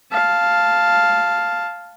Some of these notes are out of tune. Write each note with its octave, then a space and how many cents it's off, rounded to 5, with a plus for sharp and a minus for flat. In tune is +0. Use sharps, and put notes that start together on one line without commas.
F5 +0 A5 +0